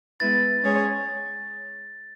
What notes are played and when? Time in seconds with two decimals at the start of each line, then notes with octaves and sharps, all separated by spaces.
0.20 G#3 B3 E4 B4 A6
0.64 G#3 C#4 G#4 C#5